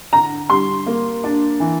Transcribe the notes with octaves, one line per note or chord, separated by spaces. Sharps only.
D3 A#5
G3 C6
A#3
D4
E3